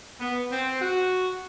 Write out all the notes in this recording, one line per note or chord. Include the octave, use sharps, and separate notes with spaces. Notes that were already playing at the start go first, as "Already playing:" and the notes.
B3
C4
F#4